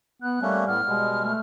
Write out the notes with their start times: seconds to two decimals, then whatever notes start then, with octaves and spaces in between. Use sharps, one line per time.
0.22 B3 F#6
0.42 G3 A3 A#3 C#4
0.67 A2 B3 F6
0.87 B2 G3 G#3
1.24 A3